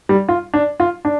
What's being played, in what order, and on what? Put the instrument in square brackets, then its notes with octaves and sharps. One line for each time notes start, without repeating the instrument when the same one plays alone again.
[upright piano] G3
F4
D4
F4
D4